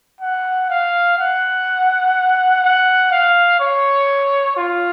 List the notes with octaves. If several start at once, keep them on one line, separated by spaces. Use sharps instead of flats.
F#5
F5
F#5
F#5
F5
C#5
F4